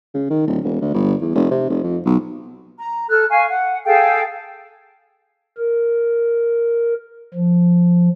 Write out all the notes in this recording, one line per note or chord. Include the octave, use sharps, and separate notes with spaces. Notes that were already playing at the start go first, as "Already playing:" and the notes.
C#3
D#3
D1
E1
D2
G1
E2
F1
C3
F1
F2
B1
A#5
A4 F6 F#6
F5 G#5 C#6
F#5
G#4 A4 F5 G5
A#4
F3